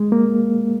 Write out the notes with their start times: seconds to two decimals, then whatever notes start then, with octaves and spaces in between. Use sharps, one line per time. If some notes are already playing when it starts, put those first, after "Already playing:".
Already playing: G#3
0.12 A#3